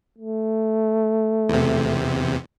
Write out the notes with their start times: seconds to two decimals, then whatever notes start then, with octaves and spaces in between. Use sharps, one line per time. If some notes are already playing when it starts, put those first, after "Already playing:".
0.18 A3
1.49 E2 C3